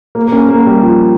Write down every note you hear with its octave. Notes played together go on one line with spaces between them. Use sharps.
A#3
A#3
C#4
A#3
G3
F3